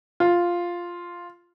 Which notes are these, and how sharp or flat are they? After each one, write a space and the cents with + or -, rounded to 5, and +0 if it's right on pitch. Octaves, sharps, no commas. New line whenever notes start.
F4 +0